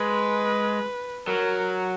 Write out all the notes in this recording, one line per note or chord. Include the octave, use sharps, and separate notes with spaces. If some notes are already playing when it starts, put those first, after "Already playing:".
Already playing: G#3 B4
F#3 A#4